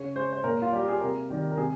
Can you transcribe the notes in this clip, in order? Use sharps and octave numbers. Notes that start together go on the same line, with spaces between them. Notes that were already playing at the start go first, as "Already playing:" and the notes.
Already playing: C#3 C#5
G#3 C5
C5
A#2 A#4
F4
G3 G4
G#4
C3 A#4
D#3 G3
A#4
C3 G#4